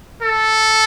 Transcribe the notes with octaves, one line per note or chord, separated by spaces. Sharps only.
A4